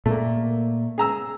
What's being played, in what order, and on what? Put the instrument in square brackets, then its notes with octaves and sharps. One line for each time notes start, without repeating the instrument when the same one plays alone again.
[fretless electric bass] A#2 A#3 [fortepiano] A3
[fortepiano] G#4 A#5 E6